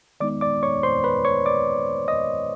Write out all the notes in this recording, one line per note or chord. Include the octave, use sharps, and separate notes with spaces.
D#3 G#3 B3 D#4 D5 D6
D5 D6
C#5 C#6
C5 C6
B4 B5
C#5 C#6
D5 D6
D#5 D#6